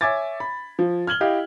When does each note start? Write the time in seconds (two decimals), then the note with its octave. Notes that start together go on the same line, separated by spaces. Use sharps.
0.01 C#5 E5 G#5 D6 G#6 A6
0.40 B5
0.79 F3
1.07 F6 G#6 F#7 G7
1.21 E4 G4 D#5 F5 G5